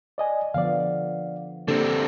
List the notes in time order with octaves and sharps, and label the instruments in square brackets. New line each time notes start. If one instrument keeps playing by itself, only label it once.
[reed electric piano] D5 D#5 G#5
[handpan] D3 F3 B3 [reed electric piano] D5 F5
[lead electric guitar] D3 C4 [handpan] A#3 D4 G4 [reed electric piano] A4